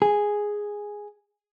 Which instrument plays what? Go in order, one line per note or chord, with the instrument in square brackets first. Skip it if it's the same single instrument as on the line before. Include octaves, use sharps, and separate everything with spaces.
[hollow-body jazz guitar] G#4